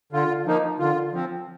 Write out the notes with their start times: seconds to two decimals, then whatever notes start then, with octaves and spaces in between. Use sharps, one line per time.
0.12 D3 F4
0.46 F3 A#3 D#4
0.79 D3 F4
1.13 F3 C4